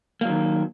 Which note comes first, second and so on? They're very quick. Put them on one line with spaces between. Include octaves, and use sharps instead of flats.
A#3 F#3 D#3